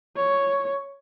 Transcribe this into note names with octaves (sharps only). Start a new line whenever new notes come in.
C#5